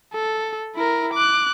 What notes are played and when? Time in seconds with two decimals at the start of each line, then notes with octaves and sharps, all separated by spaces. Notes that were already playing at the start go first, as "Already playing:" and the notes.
0.14 A4
0.75 E4 A#4
1.14 D6 F#6